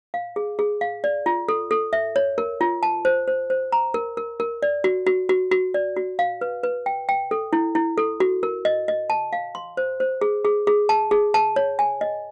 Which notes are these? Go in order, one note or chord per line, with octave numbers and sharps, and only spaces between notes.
F5
G#4
G#4
F5
D5
F4
A4
A4
E5
C#5
A#4
F4
A5
C5
C5
C5
A#5
A#4
A#4
A#4
D5
F#4
F#4
F#4
F#4
D5
F#4
F5
B4
B4
G5
G5
A4
E4
E4
A4
F#4
A#4
D#5
D#5
A5
F5
C6
C5
C5
G#4
G#4
G#4
A5
G#4
A5
C#5
G#5
D#5